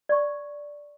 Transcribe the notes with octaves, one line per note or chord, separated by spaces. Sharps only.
D5 C#6